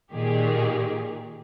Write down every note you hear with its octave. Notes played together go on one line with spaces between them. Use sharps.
A#2 D#3 G4 G#4